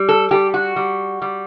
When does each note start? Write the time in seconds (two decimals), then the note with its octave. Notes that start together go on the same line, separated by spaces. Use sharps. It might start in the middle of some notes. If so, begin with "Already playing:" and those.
Already playing: G3
0.09 A4
0.31 G3 G4
0.54 F#4
0.76 G3
1.22 G3